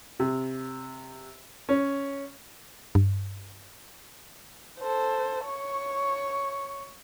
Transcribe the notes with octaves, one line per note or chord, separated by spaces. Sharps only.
C3
C#4
G2
A4 C5
C#5 C#6